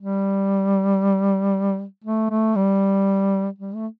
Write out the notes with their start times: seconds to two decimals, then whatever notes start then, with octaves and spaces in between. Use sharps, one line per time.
0.01 G3
2.04 A3
2.30 A3
2.55 G3
3.58 G3
3.75 A3